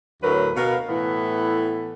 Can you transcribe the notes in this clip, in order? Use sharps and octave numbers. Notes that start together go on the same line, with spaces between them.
D2 A2 F#3 A#4 B4
B2 B3 A#4 F5
A2 E3 B3 E4 A4